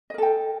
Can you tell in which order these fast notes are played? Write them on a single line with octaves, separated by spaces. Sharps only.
D#5 A#4 A4 G5